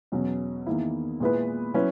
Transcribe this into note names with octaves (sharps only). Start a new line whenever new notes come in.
E2 B2 F#3 C#4
E2 D#3 A#3 E4
A#2 G#3 B3 E4 B4
F#3 C#4 E4 B4